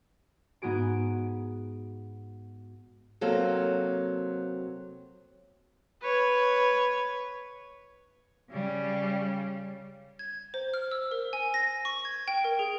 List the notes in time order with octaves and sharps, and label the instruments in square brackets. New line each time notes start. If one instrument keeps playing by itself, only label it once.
[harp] G#2 B3 F#4 G#4 D7
[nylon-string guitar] C3 F#3 A#3 A4
[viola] B4 C#5
[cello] C#3 G3
[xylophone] G#6
C5
F6
E6
A#4
G#5
A#6
C#6
G#6
G5
A#4
G#4